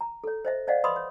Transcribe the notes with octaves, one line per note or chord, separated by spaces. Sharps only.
A#5
A4 C#5
C5 D#5 E5
C5 D5 D#5 F5 F#5
B4 D#5 B5 C6 D#6
C#5